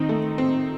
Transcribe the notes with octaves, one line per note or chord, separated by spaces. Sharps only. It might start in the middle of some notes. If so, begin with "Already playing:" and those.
Already playing: D#3 C4 D#4
A3
C4